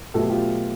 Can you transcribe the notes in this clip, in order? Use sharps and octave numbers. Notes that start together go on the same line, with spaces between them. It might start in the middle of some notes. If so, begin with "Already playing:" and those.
B2 F#3 A3 G4 A4
F4 G4